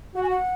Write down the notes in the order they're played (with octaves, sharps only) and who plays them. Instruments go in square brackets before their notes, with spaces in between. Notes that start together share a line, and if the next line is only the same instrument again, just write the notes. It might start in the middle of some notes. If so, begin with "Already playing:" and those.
[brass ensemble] F#4 [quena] F#5
[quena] G#5
F#5